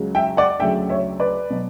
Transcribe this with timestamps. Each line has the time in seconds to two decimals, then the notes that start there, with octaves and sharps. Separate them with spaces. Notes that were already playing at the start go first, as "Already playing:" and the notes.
Already playing: C#2 C#3 F#3
0.15 E5 G5
0.37 D5 F#5
0.60 D2 C#3 F#3 E5 G5
0.89 C#5 E5
1.20 B4 D5
1.50 B2 F#3